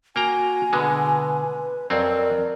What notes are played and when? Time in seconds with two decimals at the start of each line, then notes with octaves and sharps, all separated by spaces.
0.16 A#3 F#4 G5 G#5 A#5
0.73 B2 D3 G#3 B4
1.90 F2 F#3 C4 A#4 D5